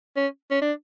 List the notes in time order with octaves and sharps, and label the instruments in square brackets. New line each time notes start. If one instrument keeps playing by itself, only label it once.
[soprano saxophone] C#4
C#4
D4